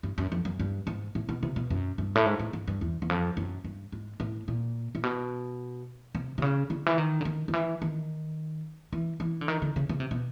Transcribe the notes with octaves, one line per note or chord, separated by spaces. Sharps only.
G2
F#2
F2
F#2
G2
G#2
A2
B2
C3
B2
F#2
G2
A2
G#2
A2
G#2
G2
E2
E2
F2
F#2
G2
G#2
A2
A#2
A#2
B2
C3
C3
C#3
D3
E3
D#3
D3
D#3
D#3
E3
D#3
E3
E3
D3
D#3
D3
C#3
C#3
C3
B2